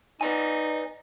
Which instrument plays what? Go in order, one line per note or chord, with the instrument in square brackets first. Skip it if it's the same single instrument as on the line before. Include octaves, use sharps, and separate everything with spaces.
[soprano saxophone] D#4 [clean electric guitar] B4 D5 G#5